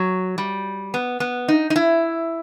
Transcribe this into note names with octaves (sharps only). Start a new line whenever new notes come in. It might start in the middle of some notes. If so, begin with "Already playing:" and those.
Already playing: F#3
G3
B3
B3
D#4
D#4
E4